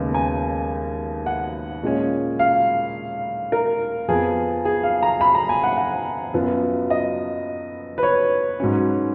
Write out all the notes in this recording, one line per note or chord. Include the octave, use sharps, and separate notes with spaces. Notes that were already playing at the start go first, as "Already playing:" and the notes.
Already playing: D#2 C#3 G#3 B3
G#5
F#5
A#2 G#3 C#4
F5
A#4
F2 F3 B3 G#4
G#4
F5
A#5
B5
A#5
G#5
F#5
F#5
F#2 F3 B3
D#5
B4
C#5
G#2 F#3 C#4